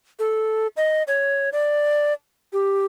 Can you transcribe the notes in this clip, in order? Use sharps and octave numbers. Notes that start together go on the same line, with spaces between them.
A4
D#5
C#5
D5
G4